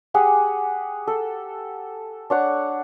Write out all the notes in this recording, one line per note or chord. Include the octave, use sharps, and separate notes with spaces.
G4 G#4 F#5 G#5
A4
D4 C#5 F#5 C#6